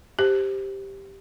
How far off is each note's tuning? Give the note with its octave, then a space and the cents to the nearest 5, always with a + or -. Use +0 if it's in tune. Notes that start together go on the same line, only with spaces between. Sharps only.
G4 +0 C5 +0